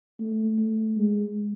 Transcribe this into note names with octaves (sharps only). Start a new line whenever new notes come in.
A3
A3
G#3